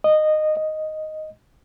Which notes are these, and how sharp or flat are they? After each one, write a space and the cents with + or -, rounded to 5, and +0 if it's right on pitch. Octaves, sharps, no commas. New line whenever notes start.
D#5 -15
D#5 +0